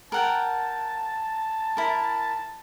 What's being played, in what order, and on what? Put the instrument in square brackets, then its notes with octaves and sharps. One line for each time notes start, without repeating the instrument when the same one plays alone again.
[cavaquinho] A#4 F#5 G5 [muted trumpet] A5
[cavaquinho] E4 A#4